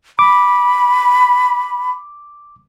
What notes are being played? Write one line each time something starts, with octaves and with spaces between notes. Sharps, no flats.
B5 D6